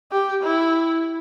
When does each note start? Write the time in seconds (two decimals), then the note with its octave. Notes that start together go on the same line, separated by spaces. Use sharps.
0.12 G4
0.43 E4